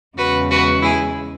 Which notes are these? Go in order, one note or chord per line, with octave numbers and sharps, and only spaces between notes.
E2 C#3 G#3 F#4 B4
F#4 B4
E4 G#4